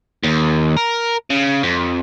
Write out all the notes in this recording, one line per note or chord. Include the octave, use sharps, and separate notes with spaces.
D#2
A#4
C#3
F2